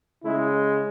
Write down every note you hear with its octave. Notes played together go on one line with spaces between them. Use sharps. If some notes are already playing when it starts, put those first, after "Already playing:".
C#3 G#3 E4